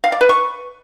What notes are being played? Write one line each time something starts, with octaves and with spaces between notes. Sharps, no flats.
F5
D5
B4
C#6